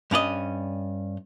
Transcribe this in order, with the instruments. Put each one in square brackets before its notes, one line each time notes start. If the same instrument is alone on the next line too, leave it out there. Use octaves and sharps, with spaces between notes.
[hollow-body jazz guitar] G2 C#4 D5 D#5